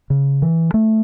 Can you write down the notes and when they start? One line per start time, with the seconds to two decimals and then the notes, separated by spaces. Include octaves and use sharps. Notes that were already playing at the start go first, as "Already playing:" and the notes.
0.10 C#3
0.42 E3
0.74 A3